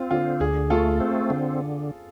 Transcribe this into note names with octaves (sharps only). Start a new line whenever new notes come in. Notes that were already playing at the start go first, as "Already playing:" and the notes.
Already playing: C4 F4
D3 F4
D2 G#4
A3 F4 A4
C4
D3